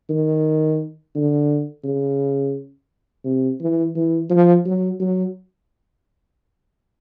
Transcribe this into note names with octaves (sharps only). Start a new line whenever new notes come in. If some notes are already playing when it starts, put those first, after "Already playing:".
D#3
D3
C#3
C3
E3
E3
F3
F#3
F#3